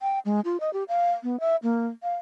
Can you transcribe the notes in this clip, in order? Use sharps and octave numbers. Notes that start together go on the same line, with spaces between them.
G5
G#3
F4
D#5
G4
F5
B3
E5
A#3
F5